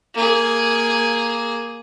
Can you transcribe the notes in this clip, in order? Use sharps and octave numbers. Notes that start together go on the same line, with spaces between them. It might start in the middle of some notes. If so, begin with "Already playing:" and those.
A#3 G#4